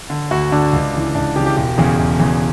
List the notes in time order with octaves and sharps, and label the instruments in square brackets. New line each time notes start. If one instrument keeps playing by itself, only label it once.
[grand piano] D3
D2 F#4
D3 D4
C#2
C#3 E3
C#2 D4
C#3 G4
E3
G4
E1 G4
E2 C#3
E1
E2 C#3